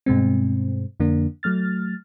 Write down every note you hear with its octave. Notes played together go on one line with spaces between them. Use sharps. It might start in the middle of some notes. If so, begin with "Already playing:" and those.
G2 B2 G#3 C4
F2 D3 A#3 D4
F#3 A3 F6 A6